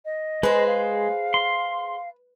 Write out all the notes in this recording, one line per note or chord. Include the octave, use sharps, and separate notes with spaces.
D#5
G#3 G#4 B4 C5
F5
C6